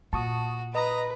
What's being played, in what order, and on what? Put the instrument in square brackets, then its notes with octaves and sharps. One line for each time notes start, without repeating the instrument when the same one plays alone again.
[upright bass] A#2 [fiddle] F#4 [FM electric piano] A5 C#6 D#6
[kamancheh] B4 [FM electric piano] D#5 D#6 A#6 [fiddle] A#5